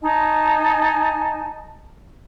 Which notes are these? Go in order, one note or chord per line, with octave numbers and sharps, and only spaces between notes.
D#4 D#5 G#5 A5